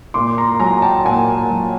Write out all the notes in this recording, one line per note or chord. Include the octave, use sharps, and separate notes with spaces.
A#2 C6 D6
A#5 C6
F#3 G#5 A#5
A#5
G5 A5
A#2 F#5 G#5
F#3